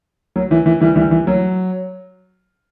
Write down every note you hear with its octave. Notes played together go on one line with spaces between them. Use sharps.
F#3
E3
E3
E3 G3
E3 G3
E3
F#3